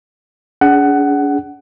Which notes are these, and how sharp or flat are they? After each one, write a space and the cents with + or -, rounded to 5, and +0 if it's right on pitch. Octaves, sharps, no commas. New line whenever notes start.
D4 -45 G#4 +0 F#5 +15